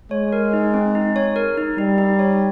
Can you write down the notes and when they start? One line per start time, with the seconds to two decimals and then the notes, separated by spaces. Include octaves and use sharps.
0.11 G#3 C#5
0.33 A#4
0.53 D#4
0.74 C4
0.95 D#4
1.16 C#5
1.36 A#4
1.58 D#4
1.78 G3 D#4
1.98 D#4
2.19 C#5